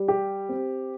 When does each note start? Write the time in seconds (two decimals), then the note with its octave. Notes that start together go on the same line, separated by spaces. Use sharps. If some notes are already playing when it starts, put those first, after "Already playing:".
Already playing: G3
0.08 G4
0.49 C4